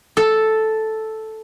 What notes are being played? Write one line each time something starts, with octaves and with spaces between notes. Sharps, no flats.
A4